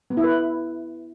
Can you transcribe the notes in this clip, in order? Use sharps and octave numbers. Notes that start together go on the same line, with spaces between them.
B3
E4
B4